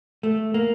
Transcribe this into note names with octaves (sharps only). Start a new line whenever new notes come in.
A3
A#3